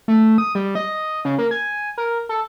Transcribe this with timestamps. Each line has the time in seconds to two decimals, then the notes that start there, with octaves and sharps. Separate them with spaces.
0.08 A3
0.38 D#6
0.55 G3
0.75 D#5
1.25 C#3
1.39 A#3
1.51 G#5
1.98 A#4
2.29 A4